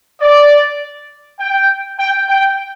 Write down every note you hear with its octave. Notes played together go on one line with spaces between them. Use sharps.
D5
G5
G5
G5